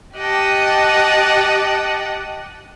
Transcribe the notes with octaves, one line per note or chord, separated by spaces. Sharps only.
G4 D#5 F#5 G5 A5